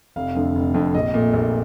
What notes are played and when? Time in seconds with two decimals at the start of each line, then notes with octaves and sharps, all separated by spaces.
0.16 F1 F5
0.35 F2 D3 A3
0.55 F1
0.74 F2 D3 A3
0.94 A#1 D#5
1.14 A#2 A3
1.33 A#1